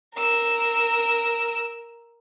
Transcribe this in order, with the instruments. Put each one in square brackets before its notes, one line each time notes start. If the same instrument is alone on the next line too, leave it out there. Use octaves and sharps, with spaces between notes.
[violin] A#4 E6